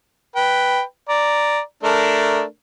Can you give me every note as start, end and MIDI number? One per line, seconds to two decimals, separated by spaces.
0.36 0.81 71
0.36 0.81 79
1.09 1.60 74
1.09 1.60 82
1.83 2.42 57
1.83 2.42 62
1.83 2.42 70